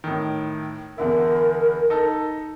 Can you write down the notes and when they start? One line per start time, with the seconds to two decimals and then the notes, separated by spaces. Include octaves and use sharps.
0.04 A2 D#3
0.98 E2 D3 E4 A#4
1.90 D#4 A4